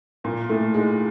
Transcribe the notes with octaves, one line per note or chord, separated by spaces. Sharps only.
A#2 A#3
A2 A3
G#2 G#3